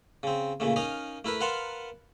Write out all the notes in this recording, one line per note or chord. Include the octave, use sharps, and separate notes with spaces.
C#3 C4
A#2 C#3 A3
C#4 D#4 A#4 D#5 F5
A3 E4 A#4 B4
A#4 B4 F5 F#5 A5 C6